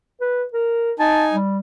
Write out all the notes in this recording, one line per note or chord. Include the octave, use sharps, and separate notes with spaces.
B4
A#4
D#4 G#5 A5
G3